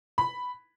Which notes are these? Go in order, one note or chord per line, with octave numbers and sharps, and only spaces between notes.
B5